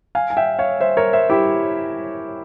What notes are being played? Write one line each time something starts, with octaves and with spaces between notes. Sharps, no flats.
F5 G#5
G#5
E5 G5
C#5 F5
C5 E5
A#4 C#5
C5 E5
E4 G4